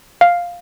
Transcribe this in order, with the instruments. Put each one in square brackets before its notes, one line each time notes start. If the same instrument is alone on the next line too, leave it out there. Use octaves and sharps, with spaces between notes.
[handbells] F5